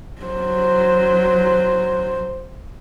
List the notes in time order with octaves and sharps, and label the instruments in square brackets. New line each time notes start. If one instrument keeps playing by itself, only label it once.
[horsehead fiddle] F#3 C5